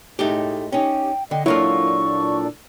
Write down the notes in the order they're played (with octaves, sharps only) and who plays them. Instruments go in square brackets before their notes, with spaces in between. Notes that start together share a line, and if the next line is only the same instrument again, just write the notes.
[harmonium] A2 G#3 [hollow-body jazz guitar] A3 D#4 G4
[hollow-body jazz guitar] C#4 D#4 [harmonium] G4 [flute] G5
[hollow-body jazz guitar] D3 [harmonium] D#5 [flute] G5
[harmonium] A#2 D4 A4 [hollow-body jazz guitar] F#3 A#3 F4 [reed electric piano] E4 [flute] C#6